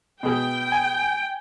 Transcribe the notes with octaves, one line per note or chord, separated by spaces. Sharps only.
B2 G#4 G5
G#5